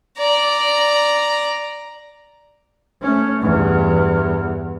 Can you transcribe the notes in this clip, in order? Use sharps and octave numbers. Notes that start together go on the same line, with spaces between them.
D5 A#5
A3 C#4
E2 G2